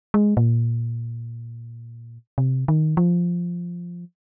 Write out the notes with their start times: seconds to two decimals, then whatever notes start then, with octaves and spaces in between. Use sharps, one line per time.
0.14 G#3
0.37 A#2
2.38 C3
2.68 D#3
2.97 F3